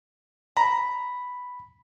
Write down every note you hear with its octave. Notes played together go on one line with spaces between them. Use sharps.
A#5 B5